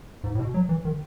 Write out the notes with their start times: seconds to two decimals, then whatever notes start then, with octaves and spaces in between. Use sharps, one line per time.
0.24 G#2
0.35 A2
0.39 B2
0.54 F#3
0.69 E3
0.85 D#3